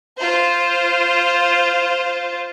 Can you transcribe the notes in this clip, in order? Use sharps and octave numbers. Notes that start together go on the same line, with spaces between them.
F4 C5